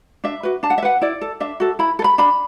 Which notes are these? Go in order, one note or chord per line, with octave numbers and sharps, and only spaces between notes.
D4 E5
F#4 B4
D4 A5
F#5
E5
B4 F#5
E4 D5
A4
D4 E5
F#4 A4
E4 B5
A4
B5
D4 B5